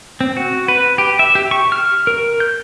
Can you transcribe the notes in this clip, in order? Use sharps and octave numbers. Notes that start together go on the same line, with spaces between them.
C4
F#4
B4
G4
E5
G4
C#6
F6
A#4
G6